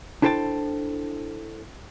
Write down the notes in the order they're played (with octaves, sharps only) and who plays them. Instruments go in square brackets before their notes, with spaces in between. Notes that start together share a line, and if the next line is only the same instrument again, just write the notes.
[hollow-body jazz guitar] D4 E4 A4 C5 G5 A5